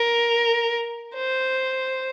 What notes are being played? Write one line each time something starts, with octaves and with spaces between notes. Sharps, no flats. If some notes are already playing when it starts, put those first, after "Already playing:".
Already playing: A#4
C5